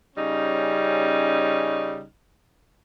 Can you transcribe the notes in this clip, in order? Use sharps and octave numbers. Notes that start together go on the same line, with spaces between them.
C#3 G3 C#4 D#4